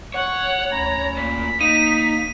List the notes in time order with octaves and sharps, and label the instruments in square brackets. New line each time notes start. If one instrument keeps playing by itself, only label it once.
[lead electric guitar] C#5 [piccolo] F#5
[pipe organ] D2 C#4 B5 [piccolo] A#5
[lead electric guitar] A#2 [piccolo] B6
[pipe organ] A#3 [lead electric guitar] D#4 [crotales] D#7